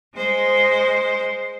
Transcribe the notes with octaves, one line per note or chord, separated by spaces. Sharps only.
G#3 C5